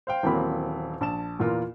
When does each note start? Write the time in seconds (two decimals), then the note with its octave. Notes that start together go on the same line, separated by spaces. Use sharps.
0.07 C5 F5 G5
0.23 D#1 E3 F#3 A#3 C4 B5
1.01 A#1 A5 E7
1.39 E2 A#2 E3 F4 A#4